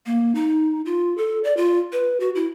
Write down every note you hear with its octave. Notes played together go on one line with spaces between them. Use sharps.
A#3
D#4
F4
A4
D5
F4
B4
F#4
E4